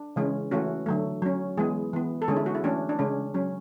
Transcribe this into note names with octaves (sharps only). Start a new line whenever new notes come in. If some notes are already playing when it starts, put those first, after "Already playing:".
Already playing: D4
C#3 E3 G#3 C#4
E3 A3 C#4 F#4
D3 F#3 A3
F#3 C#4
E3 G#3 B3 G#4
E3 B3
A4
D3 G#3 C#4 G#4
E4
F#4
E4
E3 A3 C#4 D4
D4
C#3 G#3 C#4
F#3 C#4